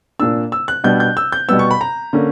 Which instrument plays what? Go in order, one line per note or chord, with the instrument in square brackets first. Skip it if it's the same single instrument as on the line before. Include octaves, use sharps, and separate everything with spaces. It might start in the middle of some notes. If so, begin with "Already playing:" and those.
[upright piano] A#2 A#3 D4 E6
E6
F#6
B2 G3 B3 D4 G6
G6
E6
G6
B2 G3 B3 E6
C#6
B5
A#5
D3 A#3 C#4